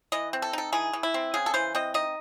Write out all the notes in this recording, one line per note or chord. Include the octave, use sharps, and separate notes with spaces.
E3 D#5
C4
A4
D#4 A4
E3 G#4
E3
E4
C4
C#3 G#4
A4
E3 C5
C4 D#5
D#4 D#5